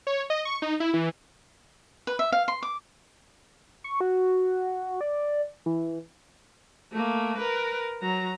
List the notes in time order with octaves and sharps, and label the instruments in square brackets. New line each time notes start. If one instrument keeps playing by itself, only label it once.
[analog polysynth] C#5
D#5
C#6
D#4
E4
E3
[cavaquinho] B4
E5
F5
C6
D6
[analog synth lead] C#6
F#4
D5
E3
[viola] A3 A#3
A#4 B4
F#3 A#5